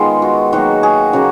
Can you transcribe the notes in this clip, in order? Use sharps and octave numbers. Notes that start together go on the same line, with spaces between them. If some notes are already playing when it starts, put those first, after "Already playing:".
Already playing: D#3 G#3 B3 F4
F#4
D#3 F#3 A#3 F#4
G#4
C#3 F#3 A#3 F#4